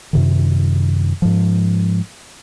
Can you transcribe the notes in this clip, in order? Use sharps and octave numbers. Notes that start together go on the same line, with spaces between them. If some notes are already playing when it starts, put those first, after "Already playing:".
F#2 C3 D#3
G#2 F3